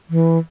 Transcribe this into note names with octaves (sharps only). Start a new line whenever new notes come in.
E3